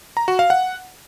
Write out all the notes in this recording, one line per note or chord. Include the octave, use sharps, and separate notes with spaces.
A#5
F#4
F5
F#5